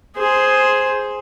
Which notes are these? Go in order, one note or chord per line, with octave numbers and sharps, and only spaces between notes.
G#4 C5